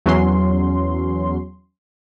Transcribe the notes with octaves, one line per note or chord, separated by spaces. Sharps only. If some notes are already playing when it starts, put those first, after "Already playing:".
E2 F#3 C#4 C6